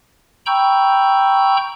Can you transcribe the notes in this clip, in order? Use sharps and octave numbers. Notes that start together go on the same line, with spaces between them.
G5 A#5 B5 C#6 E6 G6